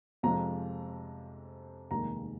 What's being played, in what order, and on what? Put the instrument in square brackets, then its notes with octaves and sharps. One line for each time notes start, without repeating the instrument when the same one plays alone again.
[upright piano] F2 C3 F3 G#3 A#5
F1 D#2 D#3 G#3 A#5